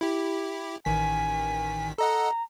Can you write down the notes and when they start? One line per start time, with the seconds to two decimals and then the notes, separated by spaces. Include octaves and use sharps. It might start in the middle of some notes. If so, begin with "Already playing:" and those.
0.01 E4 G4
0.85 A1 D#3 G#5 B6
1.98 A4 D#5 F#5 A#5